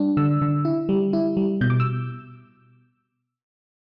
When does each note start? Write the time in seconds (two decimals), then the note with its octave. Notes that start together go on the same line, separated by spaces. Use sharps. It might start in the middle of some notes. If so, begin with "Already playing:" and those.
Already playing: G3 D4
0.17 D3 E6
0.42 D3
0.65 E4
0.89 G3
1.13 E4
1.37 G3
1.61 B2 G6
1.70 D6
1.80 E6